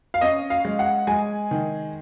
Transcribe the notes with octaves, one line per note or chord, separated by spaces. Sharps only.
F5
C#4 D#5
F5
G#3
F#5
G#3 G#5
D#3